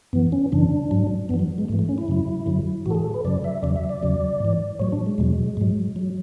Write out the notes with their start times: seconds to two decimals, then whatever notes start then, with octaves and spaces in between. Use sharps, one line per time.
0.13 F#2 E3 B3
0.32 C#4
0.52 F#2 C#3 E3 D4
0.91 G#2 F#3
1.29 F#2 E3 B3
1.39 F#3
1.58 G#3
1.68 G#2 E3 A3
1.79 A3
1.89 C#4
1.98 E4
2.08 F#2 C#3 F#3
2.46 F#2 D3 F#3
2.86 A2 E3 F#4 A4
2.95 G#4
3.04 A4
3.14 B4
3.25 F#2 C#3 F#3 D5
3.44 E5
3.63 E2 C#3 F#3 D5
3.76 E5
3.89 D5
4.02 E2 C#3 F#3
4.40 G#2 E3
4.79 A2 F#3 C#5
4.92 D4
5.06 G#3
5.18 E2 B2 F#3
5.57 G#2 F#3
5.96 F#3